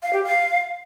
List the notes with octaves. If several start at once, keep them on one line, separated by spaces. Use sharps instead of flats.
F5
G4
F5